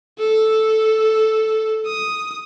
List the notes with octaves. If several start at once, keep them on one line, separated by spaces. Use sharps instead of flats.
A4
D#6